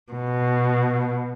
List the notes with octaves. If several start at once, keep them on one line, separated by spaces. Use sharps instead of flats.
B2